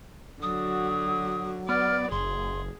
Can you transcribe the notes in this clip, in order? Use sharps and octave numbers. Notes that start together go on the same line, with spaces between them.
D3 F#3 F#4 D#6
B3 D5 F6
F#1 G#4 C6